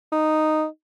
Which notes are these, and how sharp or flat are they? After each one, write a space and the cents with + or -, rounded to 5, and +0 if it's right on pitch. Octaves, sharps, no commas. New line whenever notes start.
D#4 -5